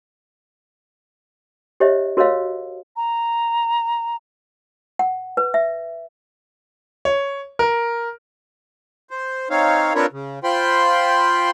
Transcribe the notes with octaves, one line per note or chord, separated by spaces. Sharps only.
G4 C5 C#5 D#5 E5
F#4 A#4 C5 C#5 D#5 F5
A#5
F#5
B4
E5
C#5
A#4
C5
C4 D#4 C#5 F5
C4 D4 F4 A#4 B4 C#5
C#3
F4 C5 G5 B5 C6